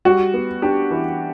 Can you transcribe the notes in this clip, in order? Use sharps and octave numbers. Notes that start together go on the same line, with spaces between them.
G3 F#4
B3
D4 G4
E3